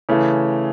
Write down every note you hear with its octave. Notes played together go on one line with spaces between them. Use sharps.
C#3 E3 A3